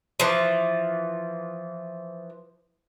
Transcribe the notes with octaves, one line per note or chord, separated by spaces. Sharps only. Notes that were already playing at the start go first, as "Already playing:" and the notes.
E3 F3